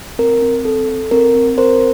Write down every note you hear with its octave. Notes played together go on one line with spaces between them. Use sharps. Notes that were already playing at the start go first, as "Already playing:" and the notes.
C4 A#4
C4
C4 A4
A4
C4 A#4
C4
C4 A#4 C5